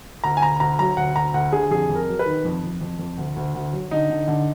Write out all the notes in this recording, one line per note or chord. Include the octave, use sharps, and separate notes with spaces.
D2 A#5
G#5
D2 A#5
D2 A#5
F#3 A#5
D2 F#5
D2 A#5
D2 F#5
D3 G#4
F2 G#4
F2
A#4
F#3
B4
D#3
F2
F2
F2
F2
D2
D2
D2
F#3
D3 D#4
D3
D3